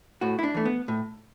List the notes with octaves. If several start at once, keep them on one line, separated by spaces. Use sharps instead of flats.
A2 F#4
E4
D4
E3 A3
B3
A2